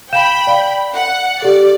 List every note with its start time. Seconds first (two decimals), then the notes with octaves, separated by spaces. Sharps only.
0.13 F5 G5 B5 G6 E7
0.47 D5 F5
0.94 F#5
1.42 G4 A4 D5